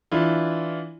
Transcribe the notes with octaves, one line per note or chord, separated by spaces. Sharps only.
E3 D4 E4 F4